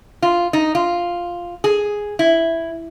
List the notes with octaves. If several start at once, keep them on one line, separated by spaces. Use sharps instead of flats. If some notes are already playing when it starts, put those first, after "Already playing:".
F4
D#4
F4
G#4
E4